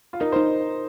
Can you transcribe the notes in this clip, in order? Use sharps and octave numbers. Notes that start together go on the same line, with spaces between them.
F4
D#4 A#4
C5
D#4